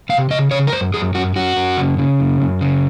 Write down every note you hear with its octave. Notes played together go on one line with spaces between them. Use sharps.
C3 F5
C#3 D#5
C#3 C#5
A#4
F#2 C5
F#2 G#4
F#2 F#4
F#2 F#4
F#2
C#3
C#3
F#2
F#2
C#3